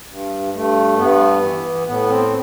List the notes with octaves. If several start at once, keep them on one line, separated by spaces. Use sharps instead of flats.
G2
G2 A3
G2 B3
E3
A2 B3
C4